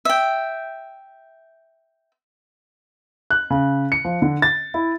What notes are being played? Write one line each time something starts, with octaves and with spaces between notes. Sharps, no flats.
E5 G5
F#6
C#3
C#7
F3
D3
A6
E4